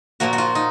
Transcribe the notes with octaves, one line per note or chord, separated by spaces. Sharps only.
A#2 F3 A#3 F#4
F#4
F4
D#4